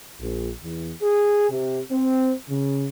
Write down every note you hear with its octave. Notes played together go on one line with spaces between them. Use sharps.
A#1
E2
G#4
C3
C4
C#3